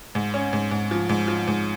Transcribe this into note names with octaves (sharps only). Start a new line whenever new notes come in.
G#2
C#4
G#2
G#2
F3
G#2
F3
G#2